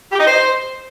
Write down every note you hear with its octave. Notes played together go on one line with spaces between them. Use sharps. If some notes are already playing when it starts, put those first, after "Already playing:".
G4
D#4
C5